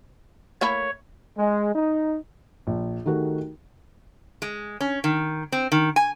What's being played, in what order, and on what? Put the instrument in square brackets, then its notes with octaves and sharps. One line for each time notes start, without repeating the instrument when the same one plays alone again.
[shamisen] A3 A#3 E4 [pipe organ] C#5
[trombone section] G#3
D#4
[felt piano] A#1
D#3 A3 D#4 F#4 G4 A#4
[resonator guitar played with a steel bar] G#3
C#4
D#3
C4
D#3
G#5